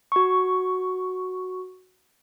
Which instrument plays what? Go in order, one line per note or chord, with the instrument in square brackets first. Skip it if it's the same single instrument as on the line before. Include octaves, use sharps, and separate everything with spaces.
[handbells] F#4 C#6